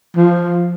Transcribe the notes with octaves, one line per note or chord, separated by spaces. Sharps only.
F3